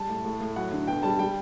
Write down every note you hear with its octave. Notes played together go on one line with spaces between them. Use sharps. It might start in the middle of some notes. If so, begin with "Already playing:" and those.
Already playing: G3 A5
A2
A2
A2
F#3 F#5
D3
B2 G5
G3 A5
G3 G5